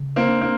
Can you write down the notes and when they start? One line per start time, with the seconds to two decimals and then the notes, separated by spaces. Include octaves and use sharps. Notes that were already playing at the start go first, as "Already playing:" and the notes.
Already playing: C#3
0.16 A#3 C4
0.28 D4
0.41 A#3 C4